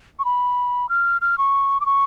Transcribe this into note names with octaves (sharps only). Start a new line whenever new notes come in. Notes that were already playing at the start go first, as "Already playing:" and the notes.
C#6
B5
F6
F6
C#6
D6
C#6